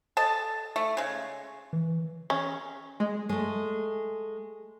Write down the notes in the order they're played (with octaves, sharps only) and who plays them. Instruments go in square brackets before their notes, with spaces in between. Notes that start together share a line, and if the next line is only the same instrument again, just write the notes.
[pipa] A4 D#5 A5
A3
C#3 G#3
[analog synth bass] E3
[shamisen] C#4
[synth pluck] G#3
[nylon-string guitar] G#3 A3